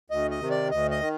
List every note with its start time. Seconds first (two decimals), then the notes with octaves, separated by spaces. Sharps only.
0.10 D2 D#5
0.31 D#5
0.40 C3 D#3
0.50 D5
0.71 D2 D#5
0.91 D#5
1.01 D#3